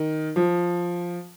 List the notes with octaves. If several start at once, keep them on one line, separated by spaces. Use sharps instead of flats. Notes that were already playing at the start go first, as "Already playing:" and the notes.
Already playing: D#3
F3